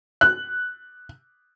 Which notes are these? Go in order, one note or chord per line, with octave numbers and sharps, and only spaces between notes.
F#6